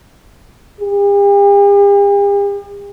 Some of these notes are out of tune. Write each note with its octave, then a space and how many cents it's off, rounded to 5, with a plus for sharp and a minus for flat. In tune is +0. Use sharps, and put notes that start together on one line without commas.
G4 +45